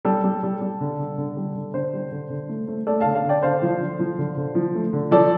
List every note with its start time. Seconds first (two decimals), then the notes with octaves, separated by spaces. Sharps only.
0.05 G3 A4
0.24 G3
0.43 G3
0.61 G3
0.80 D3
0.99 D3
1.18 D3
1.37 G3
1.55 D3
1.74 D3 C5
1.93 G3
2.12 D3
2.30 D3
2.49 A3
2.68 A3
2.87 A3 A4 D5
3.00 D3 F5 A5
3.14 F5 A5
3.24 D3 D5 G5
3.43 D3 C5 F5
3.62 F3
3.80 D3
3.99 F3
4.18 D3
4.37 D3
4.55 F3
4.75 A3
4.93 D3
5.11 F3 A4 D5